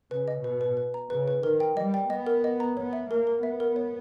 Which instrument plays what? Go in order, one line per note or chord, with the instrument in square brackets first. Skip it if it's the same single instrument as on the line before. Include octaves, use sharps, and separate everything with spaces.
[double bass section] C#3 [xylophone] B4
[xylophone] D#5
[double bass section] B2 [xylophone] B4
[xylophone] B4
B4
A#5
[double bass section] C#3 [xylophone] B4
[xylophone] B4
[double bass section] D#3 [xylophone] A#4
[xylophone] G5
[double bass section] G3 [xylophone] D#5
[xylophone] G5
[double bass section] B3 [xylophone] D#5
[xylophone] A#4
D#5
A#5
[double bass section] B3 [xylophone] C#5
[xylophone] E5
[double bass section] A#3 [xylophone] A#4
[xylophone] A#4
[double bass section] B3 [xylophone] E5
[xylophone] A#4
C#5